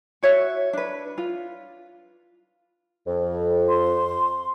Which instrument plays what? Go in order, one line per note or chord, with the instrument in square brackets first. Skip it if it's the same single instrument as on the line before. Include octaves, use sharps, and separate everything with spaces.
[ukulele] F#4 C#5 E5
D4 B4
F4
[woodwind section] F2
[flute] C6